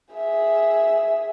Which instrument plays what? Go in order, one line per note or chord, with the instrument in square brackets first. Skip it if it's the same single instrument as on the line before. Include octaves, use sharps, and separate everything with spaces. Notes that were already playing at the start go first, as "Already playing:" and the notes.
[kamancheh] G#4 E5